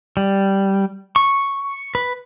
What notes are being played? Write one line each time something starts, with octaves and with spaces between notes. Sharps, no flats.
G3
C#6
B4